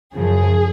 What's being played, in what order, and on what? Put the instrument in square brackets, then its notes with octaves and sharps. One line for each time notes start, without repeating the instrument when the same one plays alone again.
[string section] F#2 C#3 F3 G#4